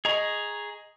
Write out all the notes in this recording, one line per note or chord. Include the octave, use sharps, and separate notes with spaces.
G#4 D#5 A#5 C#6